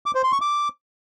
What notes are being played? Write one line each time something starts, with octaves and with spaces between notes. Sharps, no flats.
D6
C5
C6
C#6
D6